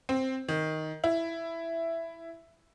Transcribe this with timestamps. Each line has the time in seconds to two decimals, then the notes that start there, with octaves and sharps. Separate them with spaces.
0.09 C4
0.48 D#3
1.04 E4